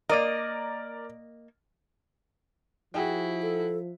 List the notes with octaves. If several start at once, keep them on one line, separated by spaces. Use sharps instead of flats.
A#3 A#4 D5 D#5
F3 E4 F#4 G#4 G5
A4